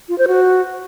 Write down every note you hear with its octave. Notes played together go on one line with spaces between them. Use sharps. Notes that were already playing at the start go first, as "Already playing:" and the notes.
F4
C5
F#4